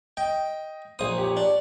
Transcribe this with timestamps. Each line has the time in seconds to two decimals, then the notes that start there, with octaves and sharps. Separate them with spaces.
0.17 D#5 G5
0.99 A#1 C5 D#6
1.18 G4 C#5
1.37 D4